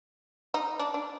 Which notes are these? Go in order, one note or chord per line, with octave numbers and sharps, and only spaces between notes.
D#4
D4
D4